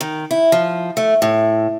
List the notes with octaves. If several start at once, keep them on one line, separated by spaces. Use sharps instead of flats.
D#3
E4
F3
A3
A2